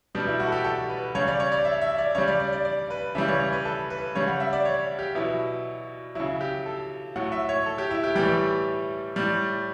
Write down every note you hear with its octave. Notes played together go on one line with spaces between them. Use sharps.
B2 G3 D4
E4
F#4
A4
G4
A4
B4
C#3 G3 C#5
D5
C#5
D5
E5
E5
D5
C#3 G3 C#5
D5
D5
D5
D5
B4
C#3 E3 G3 E5
C#5
C#5
B4
A4
B4
C#3 G3 C#5
F#5
E5
D5
C#5
G4
B2 F#3 E4
C#3 F#3 E4
G4
A4
A2 F#3 F#5
E5
C#5
A4
G4
E4
G4
A2 E3 G3 G4
A2 G3